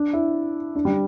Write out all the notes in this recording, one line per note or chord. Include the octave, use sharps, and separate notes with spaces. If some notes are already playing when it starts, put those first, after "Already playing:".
Already playing: D4
E4
D4
G3